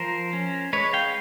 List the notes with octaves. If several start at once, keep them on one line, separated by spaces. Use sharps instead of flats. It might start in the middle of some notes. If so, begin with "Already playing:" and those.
Already playing: F3 A#4 C5
C#4
G#3 B4 C#5
F5 G5